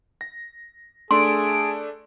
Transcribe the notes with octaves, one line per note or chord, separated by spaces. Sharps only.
A#6
A3 D4 G#4 A4 C6 D7